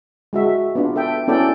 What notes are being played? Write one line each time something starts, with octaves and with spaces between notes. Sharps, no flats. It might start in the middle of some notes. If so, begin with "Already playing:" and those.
G#3 F#4 E5
B3 D4 F4
A4 E5 G5
B3 C#4 E4 A4 D5 G5